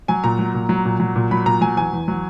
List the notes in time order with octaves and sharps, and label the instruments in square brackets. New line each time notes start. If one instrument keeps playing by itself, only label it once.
[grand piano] F#3 G#5
A#2 A#5
F#3
A#2
F#3
A#2
F#3
A#2
F#3 B5
A#2 A#5
F#3 G#5
E2 G#5
E2
F#3